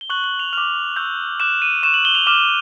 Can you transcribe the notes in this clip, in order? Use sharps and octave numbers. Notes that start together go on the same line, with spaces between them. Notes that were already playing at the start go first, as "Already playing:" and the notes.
G7
C#6 F#6 F#7
F#7
F7
D6 F6 F7
C#6 E6 G6
D6 F#6 E7
D#7
C#6 F#6 E7
F#7
G7
F7
D6 F6 E7